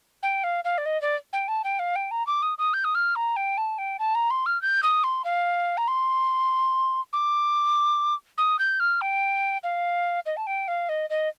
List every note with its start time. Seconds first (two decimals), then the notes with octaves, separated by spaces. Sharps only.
0.23 G5
0.44 F5
0.64 F5
0.78 D5
0.86 D#5
1.02 D5
1.33 G5
1.48 A5
1.64 G5
1.79 F5
1.96 G5
2.11 A#5
2.27 D6
2.42 D#6
2.58 D#6
2.74 G6
2.84 D#6
2.95 F6
3.16 A#5
3.36 G5
3.57 A5
3.78 G5
3.99 A5
4.15 A#5
4.30 C6
4.46 F6
4.62 G6
4.83 D#6
5.04 C6
5.25 F5
5.77 A#5
5.88 C6
7.13 D6
8.38 D#6
8.59 G6
8.80 F6
9.01 G5
9.63 F5
10.26 D#5
10.37 A5
10.47 G5
10.68 F5
10.89 D#5
11.10 D#5